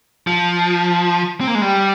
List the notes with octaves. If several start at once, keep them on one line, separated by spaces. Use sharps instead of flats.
F3
C4
A#3
G#3
G3